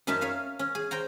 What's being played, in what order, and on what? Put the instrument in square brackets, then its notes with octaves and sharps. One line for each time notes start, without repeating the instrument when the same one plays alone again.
[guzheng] F#2 C#4 D#4 E5 A5
C#5 E5 F5 G#5
C#4
G#4
C5 G5 A#5